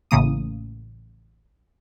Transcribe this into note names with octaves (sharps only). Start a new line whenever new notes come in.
A1 A2 C#3 A#3 D#6